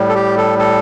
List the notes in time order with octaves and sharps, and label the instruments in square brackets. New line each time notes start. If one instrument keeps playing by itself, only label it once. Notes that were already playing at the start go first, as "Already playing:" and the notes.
Already playing: [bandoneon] A2 G3
A4
G4
A4
A4